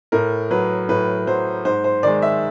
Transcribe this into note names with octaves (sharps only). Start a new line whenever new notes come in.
A2 A#4
F#3 B4
A2 B4
F#3 C5
G#2 C5
C5
D#3 G#3 D5
E5